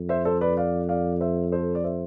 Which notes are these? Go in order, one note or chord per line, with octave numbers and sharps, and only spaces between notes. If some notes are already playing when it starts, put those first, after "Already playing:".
Already playing: F2
C5 E5
A4 C5
B4 D5
D5 F5
D5 F5
C5 E5
A4 C5
D5
C5 E5